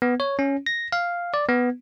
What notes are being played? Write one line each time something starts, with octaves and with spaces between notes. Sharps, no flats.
B3
C#5
C#4
A#6
F5
D5
B3